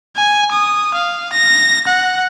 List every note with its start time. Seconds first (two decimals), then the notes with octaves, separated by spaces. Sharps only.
0.16 G#5
0.52 D#6
0.94 F5
1.33 A#6
1.87 F#5